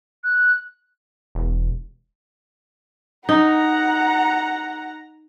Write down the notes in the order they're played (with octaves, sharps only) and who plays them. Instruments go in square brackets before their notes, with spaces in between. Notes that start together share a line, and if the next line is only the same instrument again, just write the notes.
[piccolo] F#6
[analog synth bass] E1
[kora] D#4 [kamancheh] F#5 A#5